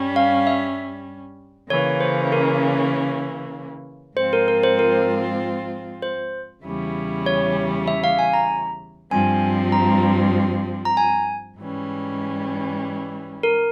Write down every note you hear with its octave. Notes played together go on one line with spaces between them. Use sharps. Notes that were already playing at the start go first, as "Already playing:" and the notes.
Already playing: G2 G3 C#4
F5
E5
C#3 E3 A#3 C#4 C#5
C5
A#4
G#2 F3 C4 F4 C5
A#4
A#4
C5
A#4
C5
E2 C#3 G3 C#4 E4
C#5
E5
F5
G#5
A#5
G2 F3 C4 G#5
A#5
A#5
G#5
G#2 E3 G3 C#4
A#4